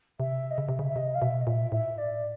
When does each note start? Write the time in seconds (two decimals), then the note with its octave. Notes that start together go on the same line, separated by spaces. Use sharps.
0.19 C3 E5
0.50 D#5
0.58 C#3 E5
0.69 C3
0.79 C#3
0.88 E5
0.96 C3 D#5
1.14 F5
1.21 B2 E5
1.40 D#5
1.46 A#2 E5
1.72 A2 E5
1.97 D5